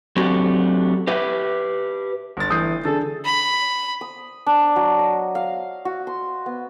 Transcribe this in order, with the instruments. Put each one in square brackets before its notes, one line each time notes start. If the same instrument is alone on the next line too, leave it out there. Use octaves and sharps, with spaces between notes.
[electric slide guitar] F#3 A3 C4 D4 F#4 G4
G4 B4 E5
[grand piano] G1 A6
[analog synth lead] E3 [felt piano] D#6 G6 C7
[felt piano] D3 G#4 [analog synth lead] A4 [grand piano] A6
[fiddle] B5
[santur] D#6
D4
F#3
D#5
F5
F#4
C6
B3